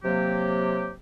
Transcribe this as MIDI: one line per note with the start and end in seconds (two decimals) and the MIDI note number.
0.04 0.91 48
0.04 0.91 54
0.04 0.91 58
0.04 0.91 67